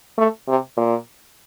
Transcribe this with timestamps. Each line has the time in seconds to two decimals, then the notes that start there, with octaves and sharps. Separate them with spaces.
0.18 A3
0.48 C3
0.77 A#2